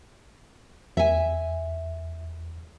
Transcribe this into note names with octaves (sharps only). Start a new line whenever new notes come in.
E2 E5 G#5